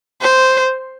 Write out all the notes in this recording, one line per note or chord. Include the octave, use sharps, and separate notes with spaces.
C5